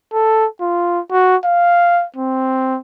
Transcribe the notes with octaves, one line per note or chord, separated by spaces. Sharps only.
A4
F4
F#4
F5
C4